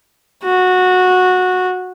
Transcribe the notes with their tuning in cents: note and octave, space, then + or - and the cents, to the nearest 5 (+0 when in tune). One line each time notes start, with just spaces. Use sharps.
F#4 -15